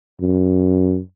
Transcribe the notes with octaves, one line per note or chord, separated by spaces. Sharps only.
F#2